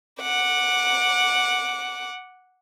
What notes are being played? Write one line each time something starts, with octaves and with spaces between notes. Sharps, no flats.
F#5 D6